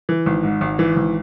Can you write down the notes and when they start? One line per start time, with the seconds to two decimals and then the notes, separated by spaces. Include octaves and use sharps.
0.09 E3
0.26 G#1
0.43 G#2
0.61 G#1
0.79 E3
0.96 G#1